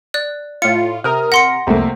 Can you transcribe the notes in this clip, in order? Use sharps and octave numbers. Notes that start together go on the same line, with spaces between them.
D5 F#6
A2 F4 C#7
C3 A#4 A#5 D#6 F6
F#5 C6 A#6 C#7
C2 F2 C3 A3 A#3